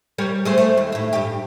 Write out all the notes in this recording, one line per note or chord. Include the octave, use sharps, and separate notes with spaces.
G3 A#4 C#5
G#3 A3 C5
A3
D#2
A2 E5
G2 G4